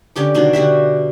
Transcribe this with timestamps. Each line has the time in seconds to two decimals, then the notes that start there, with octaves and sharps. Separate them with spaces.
0.16 D3 C#4 G4 D6
0.35 B2 D#3 F#3 D4
0.53 D3 F#4 G4 E5